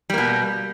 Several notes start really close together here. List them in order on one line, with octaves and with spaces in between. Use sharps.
G3 A#3 B2